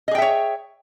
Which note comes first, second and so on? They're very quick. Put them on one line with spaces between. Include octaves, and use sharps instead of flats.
D#5 G#4 G5 E5 C#5